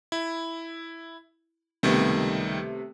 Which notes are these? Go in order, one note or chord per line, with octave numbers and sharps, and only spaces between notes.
E4
C#2 C3 D#3 G3 A3 B3